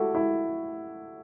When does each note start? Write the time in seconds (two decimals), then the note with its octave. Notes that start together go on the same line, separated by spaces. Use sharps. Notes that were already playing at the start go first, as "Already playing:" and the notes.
Already playing: E4 F#4 G4 A4
0.15 E4